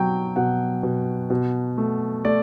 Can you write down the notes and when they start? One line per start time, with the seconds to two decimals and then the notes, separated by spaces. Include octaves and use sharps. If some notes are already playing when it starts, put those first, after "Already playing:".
Already playing: B2 F#3 G5
0.36 B2 F#5
0.83 B2
1.30 B2
1.78 A3
2.25 A3 D5